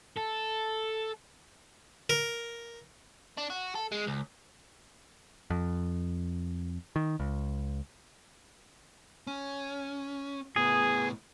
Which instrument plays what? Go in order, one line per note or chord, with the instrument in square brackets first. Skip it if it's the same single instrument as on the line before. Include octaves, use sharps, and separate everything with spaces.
[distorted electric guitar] A4
[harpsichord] A#4
[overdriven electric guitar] D4
F#4
A4
G#3
C#2
[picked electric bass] F2
D#3
C#2
[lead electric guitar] C#4
[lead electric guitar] A2 B3 [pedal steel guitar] G#4